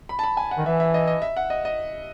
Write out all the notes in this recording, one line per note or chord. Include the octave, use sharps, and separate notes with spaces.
B5
A5
B5
G#5
F#5
D#3
E3 E5
E5
D#5
D#5
E5
F#5
D#5
D#5